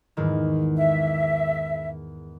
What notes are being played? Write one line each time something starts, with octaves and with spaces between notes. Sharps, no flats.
E2 G#2 D#3
E5